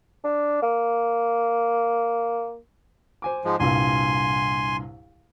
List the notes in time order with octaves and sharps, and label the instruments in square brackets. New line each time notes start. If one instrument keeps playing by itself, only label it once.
[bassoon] D4
A#3
[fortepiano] C5 G#5 D6
[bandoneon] G#2 F3 G#3
[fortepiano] C2 G2 A#2 [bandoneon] G#5 C6